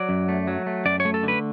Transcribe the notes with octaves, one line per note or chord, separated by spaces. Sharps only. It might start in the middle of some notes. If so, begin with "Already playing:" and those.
Already playing: F#3 D5
F#2
A3
F#3
A3
F#2 D5
C#5
A3
A4
D3 B4